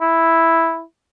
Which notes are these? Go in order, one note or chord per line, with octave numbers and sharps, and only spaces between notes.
E4